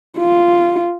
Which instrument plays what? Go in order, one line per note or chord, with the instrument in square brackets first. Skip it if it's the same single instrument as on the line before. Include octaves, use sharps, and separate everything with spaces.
[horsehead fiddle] F4